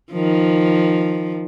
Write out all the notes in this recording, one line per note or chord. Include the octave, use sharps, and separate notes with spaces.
D#3 F3